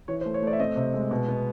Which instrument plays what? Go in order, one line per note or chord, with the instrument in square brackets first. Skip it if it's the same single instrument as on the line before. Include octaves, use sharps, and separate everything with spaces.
[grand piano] E3 C#5
C5
A3
C#5
A3 D5
E5
C4 D#5
C3
G#3
B2
B3